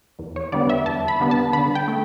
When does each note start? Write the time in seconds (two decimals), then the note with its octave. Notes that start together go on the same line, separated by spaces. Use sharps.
0.19 E2
0.36 C#5
0.52 D3 G3 B3 D5
0.69 E5
0.86 E2 A5
1.08 B5
1.20 D3 G3 B3
1.31 A5
1.53 D3 B5
1.75 G5
1.88 A3